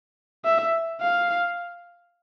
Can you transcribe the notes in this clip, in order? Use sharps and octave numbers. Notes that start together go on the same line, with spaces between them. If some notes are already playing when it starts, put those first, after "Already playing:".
E5
F5